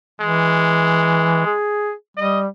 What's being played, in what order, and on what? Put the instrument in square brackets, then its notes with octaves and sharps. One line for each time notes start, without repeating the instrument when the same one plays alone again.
[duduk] E3 [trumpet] G#3
[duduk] G#4
[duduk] G3 [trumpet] D#5